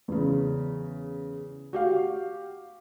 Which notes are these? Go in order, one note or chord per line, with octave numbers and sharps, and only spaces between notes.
E2 C#3
F#4 G4 F5